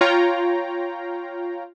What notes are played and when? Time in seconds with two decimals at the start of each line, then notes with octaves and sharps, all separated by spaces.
0.01 F4 C#5 F5 G5 A#5